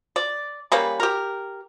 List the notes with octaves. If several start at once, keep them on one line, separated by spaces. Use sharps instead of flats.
D5
G3 A#3 C#4 B4
G4 A#4